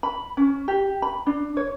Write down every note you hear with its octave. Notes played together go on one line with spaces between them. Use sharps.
B5
C#4
G4
B5
D4
C#5